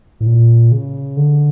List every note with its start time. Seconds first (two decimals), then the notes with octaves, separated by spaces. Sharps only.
0.21 A2
0.26 A#2
0.72 C#3
1.17 D3